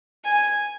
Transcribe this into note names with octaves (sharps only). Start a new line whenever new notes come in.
G#5